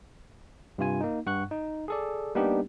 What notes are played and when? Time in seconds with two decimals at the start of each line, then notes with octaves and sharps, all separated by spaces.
0.78 G2 C3 F4 G#5
1.01 A#3 D#4
1.26 G2 F#5 C#6 F#6
1.51 D#4
1.88 G#4 A4 D5
2.35 G3 A#3 B3 D4 D#4 G4